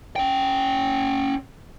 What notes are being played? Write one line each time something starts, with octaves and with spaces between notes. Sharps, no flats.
C#4 G5